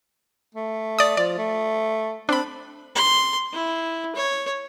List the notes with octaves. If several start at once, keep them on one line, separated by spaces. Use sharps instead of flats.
A3
D5 D#6
F3 D5
A3
C4 D4 B5
C6
E4
C#5